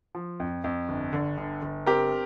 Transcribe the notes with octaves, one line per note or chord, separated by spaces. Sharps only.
F3
F2
F2
G1
D3
G1
G1
C4 G4 A#4